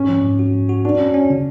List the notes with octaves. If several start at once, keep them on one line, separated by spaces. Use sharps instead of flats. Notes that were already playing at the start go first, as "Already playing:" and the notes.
Already playing: G#2 C#4
F3
G#2
F#4
G#2
F#4
D4 F#4
C#4
C#4
C#3